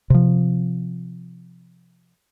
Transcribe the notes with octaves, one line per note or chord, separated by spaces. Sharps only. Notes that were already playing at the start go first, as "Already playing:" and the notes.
C3 F3